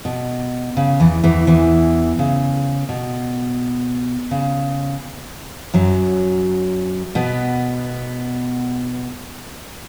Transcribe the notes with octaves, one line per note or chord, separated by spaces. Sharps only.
B2
C#3
E2 E3
E2 E3
E2 E3
C#3
B2
C#3
F#2 F#3
B2 B3